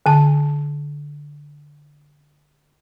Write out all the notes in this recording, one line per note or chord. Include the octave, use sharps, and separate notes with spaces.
D3 A5